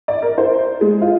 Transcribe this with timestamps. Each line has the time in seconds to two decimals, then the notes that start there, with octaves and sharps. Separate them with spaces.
0.08 D5
0.22 A#4
0.38 C5
0.81 G#3
1.02 F4